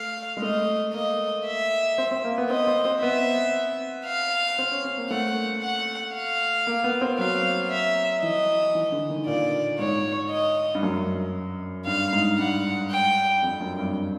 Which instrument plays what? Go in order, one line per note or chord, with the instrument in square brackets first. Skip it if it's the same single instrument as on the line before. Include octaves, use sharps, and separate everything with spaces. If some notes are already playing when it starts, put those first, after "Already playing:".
Already playing: [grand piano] A3 [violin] F5
[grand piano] G#3
[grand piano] A3 [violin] D#5
[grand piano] A#3 [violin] D#5
[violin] E5
[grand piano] C4
C4
A#3
B3
[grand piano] C4 [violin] D#5
[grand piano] C4
C4
[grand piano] B3 [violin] E5
[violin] F5
[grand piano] C4
C#4
C4
A#3
[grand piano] A3 [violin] F#5
[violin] F#5
F5
[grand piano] A#3
B3
C4
[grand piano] F#3 [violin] F5
[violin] E5
[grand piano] E3 [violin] D#5
[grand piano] E3
D3
D#3
[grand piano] A#2 [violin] D5
[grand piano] G#2 [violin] C#5
[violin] D#5
[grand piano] G2
F#2
[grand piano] G2 [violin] F5
[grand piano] G#2
[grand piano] G2 [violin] F#5
[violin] G5
[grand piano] F2
F#2
G2